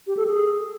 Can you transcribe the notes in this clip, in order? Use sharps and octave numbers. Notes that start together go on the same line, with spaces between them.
G4
A4
G#4